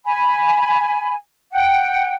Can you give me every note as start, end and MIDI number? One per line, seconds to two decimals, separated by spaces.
0.05 1.13 80
0.05 1.13 83
1.52 2.14 78
1.52 2.14 79